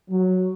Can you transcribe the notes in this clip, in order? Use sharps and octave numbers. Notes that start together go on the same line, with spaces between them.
F#3